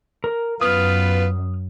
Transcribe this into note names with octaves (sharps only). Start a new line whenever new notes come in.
A#4
F#2 B3 F4 B4 D#6 F6